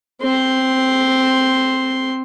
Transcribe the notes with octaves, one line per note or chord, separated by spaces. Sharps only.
C4 C6